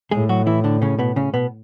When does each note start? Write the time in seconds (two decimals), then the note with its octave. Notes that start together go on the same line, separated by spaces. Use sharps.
0.11 A2 G#3 G#4
0.29 F#3 F#4
0.47 E3 E4
0.64 D3 D4
0.82 C#3 C#4
0.99 B2 B3
1.16 C#3 C#4
1.33 B2 B3